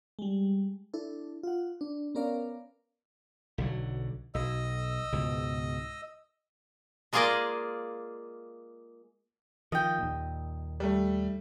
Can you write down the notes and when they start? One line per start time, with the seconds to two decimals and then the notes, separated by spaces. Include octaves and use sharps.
0.19 G3 G#3
0.94 D4 E4 A4
1.43 F4 F#5
1.81 D4
2.15 B3 C#4 A#4 D5 F5
3.58 B1 D3 F#3
4.35 B1 D#5 E6
5.12 C#2 G#2 B2
7.13 G#3 A#3 F4 G#4 D5 D#5
9.72 D#3 F3 D#5 G5
9.99 D#2 A#2
10.80 G3 A3